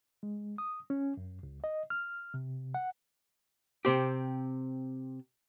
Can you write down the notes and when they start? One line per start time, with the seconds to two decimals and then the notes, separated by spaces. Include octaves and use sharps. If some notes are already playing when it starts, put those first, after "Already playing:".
0.23 G#3
0.58 D#6
0.90 C#4
1.17 F#2
1.43 C#2
1.64 D#5
1.90 F6
2.34 C3
2.74 F#5
3.85 C3 C4 G4